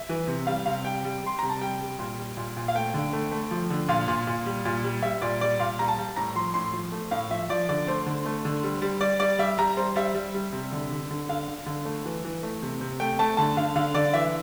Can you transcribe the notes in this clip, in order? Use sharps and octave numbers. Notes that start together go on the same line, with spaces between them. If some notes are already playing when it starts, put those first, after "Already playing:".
Already playing: E5
E3
C3
G3 F5
C3 F5
G3 G5
G3
G3 C6
C3 A#5
A5
G3 G5
G3
A#2
G3
A#2
A#2
F5
A3 G5
D3
A3
A3
F3
D3
A#2 F5
A#2
A#2
G3
A#2
G3
G3 E5
A#2 D5
G3 D5
A#2 F5
G3 A#5
A5
G3
A2 A#5
F3 C6
A2 C6
F3
A3
A2 F5
F3 E5
F3 D5
D3 D5
A3 C5
D3
A3
D3
G3
G3
G3 D5
G3 D5
G3 E5
G3 A#5
G3 C5
G3 E5
G3
G3
C3
D3
D3
D3
D3 F5
D3
D3
A3
E3
E3
A3
C3
C3
A3 G5
A3 A5
D3 A5
D3 F5
D3 F5
D3 D5
E3 E5